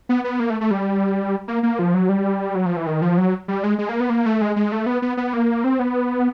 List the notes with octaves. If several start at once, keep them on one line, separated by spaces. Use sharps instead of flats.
B3
B3
A#3
A3
A3
G3
A#3
A#3
F3
F#3
G3
F#3
F3
E3
D#3
F3
F#3
G3
G#3
G#3
A#3
B3
A#3
A3
G#3
G#3
A3
B3
B3
B3
A#3
C4
B3